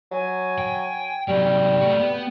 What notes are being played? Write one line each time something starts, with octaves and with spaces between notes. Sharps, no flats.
F#3 G#5
G5
C3 F#3 G3 G5
A3 F#4
B3